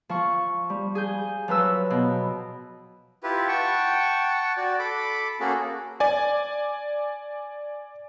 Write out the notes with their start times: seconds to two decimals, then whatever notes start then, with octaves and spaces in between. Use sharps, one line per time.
0.09 F3 C#6
0.70 G3
0.95 G#4 G6
1.48 F3 F#3 B4 E6
1.90 B2
3.23 E4 F4 G4 B4
3.48 F#5 G5 A5 C#6
4.57 F#4 D5
4.79 A4 B5 D6
5.40 A#3 C#4 F#4 G#4 A4
6.00 D5 G#5